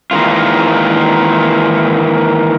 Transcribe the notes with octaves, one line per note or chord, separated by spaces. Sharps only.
D#3 E3 G#3 A#3 F4